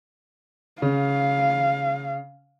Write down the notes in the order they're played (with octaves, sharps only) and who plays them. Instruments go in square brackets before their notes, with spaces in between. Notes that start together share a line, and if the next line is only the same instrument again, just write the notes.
[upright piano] C#3 [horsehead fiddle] F5